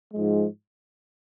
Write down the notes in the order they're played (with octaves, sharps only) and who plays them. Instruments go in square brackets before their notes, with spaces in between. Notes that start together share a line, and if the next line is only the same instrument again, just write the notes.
[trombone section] G#2 F3 G#3